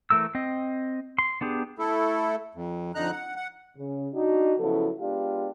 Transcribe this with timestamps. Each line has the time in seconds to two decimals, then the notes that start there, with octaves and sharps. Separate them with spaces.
0.10 E3 A3 A#4 E6
0.35 C4 D#5
1.19 C6
1.41 B3 D4 G4 G#4
1.79 A3 E4 A4
2.55 F2
2.95 F2 D3 D#4 A#5 F#6
3.12 F#5
3.36 F#5
3.77 C#3
4.13 D4 D#4 F#4
4.59 C#3 F3 F#3 B3 E4 A4
5.00 G#3 B3 D4 F4 G4